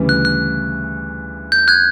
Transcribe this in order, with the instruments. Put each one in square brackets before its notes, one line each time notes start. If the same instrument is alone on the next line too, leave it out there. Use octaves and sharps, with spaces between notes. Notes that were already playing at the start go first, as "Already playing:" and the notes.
Already playing: [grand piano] D2 C#3 E3 G3
[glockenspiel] F#6
F#6
G6
F#6 G#6